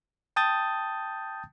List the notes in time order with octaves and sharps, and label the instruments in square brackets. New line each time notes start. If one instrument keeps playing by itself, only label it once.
[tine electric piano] G5 A5 D#6 G6 A6